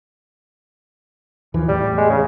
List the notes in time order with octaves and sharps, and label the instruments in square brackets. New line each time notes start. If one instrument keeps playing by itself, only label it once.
[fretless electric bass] D#2 E3 F3
[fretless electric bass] E2 A2 [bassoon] G3
[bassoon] G#3
C#3